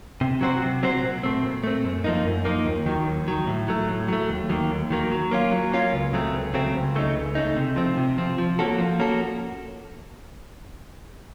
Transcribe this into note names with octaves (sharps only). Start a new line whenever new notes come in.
C3
F#3 C4 F#4 C5
C3
F#3 C4 F#4 C5
A#2
A3 C4
A#2
A3 C4
F#2
F3 A#3 D#4
F#2
F3 A#3 D#4
D#2
D#3 F#3
D#2
D#3 F#3
A2
F#3 A3
A2
F#3 A3
D#2
D#3 F#3 A#3
D#2
D#3 F#3 A#3
F#3
A#3 C#4 F4
F#3
A#3 C#4 F4
C#2
C#3 F#3 A3 C4
C#2
C#3 F#3 A3 C4
C#2
C#3 A3 D#4
C#2
C#3 A3 D#4
C3
F3 C4
C3
F3 C4
F3
A#3 C#4 F#4 A4
F3
A#3 C#4 F#4 A4